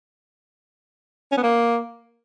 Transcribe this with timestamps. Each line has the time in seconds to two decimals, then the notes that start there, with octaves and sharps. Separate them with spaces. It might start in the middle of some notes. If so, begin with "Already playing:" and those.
1.32 C#4
1.37 B3
1.43 A#3